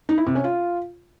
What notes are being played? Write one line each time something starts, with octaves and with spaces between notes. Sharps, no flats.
D#4
E4
C3
C#4
F4